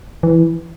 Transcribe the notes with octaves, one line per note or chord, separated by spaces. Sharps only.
E3